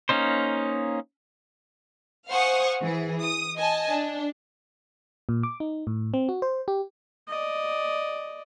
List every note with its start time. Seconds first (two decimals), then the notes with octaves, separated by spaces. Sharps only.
0.09 A#3 C#4 D#4 C5
2.29 C5 F5 F#5 G#5 C#6 D#6
2.81 E3 G#4
3.21 D#6
3.56 D#5 G#5 A5
3.89 D4
5.29 A#2
5.43 D6
5.60 D#4
5.87 A2
6.14 C4
6.29 F#4
6.42 C5
6.68 G4
7.28 D5 D#5